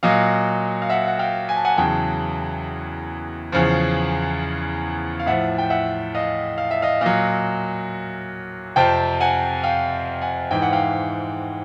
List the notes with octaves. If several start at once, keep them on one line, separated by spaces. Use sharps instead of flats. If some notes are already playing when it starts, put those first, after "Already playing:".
A#2 F#3 D#5 F5
F5
E5 F#5
F#5
F5 G5
G#5
A5
F#5 G#5
E2 C#3 F#3 G5 A5
E2 C#3 F3
F5
A2 F3 E5 F#5
G5
E5 F#5
D#5 F5
F5
E5
D#5 F5
A#2 F#3 D#5 F5
F2 C3 F3 G5 A5
F#5 G#5
F5 G5
F#5 G#5
G#2 E3 G5
F#5
F5 G5